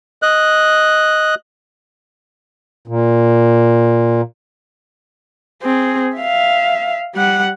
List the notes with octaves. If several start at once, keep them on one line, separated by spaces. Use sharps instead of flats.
D#5 F#6
A#2
C4 G#4
E5 F5
G3 F#5